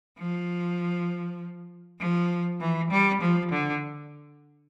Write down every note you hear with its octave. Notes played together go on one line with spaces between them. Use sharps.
F3
F3
E3
G3
F3
D3